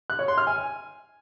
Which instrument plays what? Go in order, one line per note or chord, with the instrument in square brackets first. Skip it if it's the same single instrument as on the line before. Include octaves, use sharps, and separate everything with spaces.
[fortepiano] F#6
C#5
C6
F6
G#5